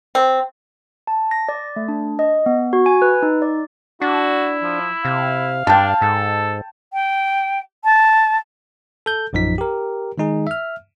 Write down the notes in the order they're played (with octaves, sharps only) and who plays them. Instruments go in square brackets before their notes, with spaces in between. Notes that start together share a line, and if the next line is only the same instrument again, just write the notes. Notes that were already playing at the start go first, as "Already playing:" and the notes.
[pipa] C4
[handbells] A5
A#6
D5
A3
D4
D#5
B3
F#4
G#5
B4
D#4
D5
[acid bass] D4 [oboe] E4 [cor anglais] F#4
[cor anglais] F3
[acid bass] C3 [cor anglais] F5
[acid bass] G2 [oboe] D4 [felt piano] G5 A5
[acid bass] G#2 [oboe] A4
[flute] G5
A5
[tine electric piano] A4 G6
A#1 F#2 F3 D#4 B6
G4 A#4
D#3 G#3 D#4 G#4
E5 F6